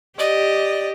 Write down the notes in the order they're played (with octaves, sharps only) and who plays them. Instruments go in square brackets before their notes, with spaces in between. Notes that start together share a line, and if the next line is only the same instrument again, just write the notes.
[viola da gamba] G4 [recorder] D5 [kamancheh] D#5